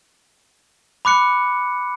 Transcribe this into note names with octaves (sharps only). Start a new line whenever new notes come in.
B5 D6 F#6 C#7